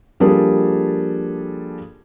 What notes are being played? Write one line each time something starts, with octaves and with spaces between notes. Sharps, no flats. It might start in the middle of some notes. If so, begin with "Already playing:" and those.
F3 G3 A#3 D4 G#4 A4